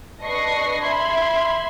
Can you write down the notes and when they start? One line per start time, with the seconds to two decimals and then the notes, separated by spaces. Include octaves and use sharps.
0.23 D4 B4 D#5 C#6 A#6 C7
0.82 E5 B5 C6 G#6 C7